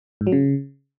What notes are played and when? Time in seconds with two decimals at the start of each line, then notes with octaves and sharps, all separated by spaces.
0.21 G#2
0.27 F#3
0.32 C#3